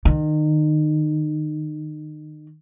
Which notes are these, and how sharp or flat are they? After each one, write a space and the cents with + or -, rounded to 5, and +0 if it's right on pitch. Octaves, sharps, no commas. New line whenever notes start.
D#3 -30